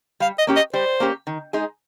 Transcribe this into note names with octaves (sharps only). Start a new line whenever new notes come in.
G3 F5
D#5
A#3 C#4 G4
D#5
G3 C5
A#3 C#4 G4
D#3
G#3 D#4 G#4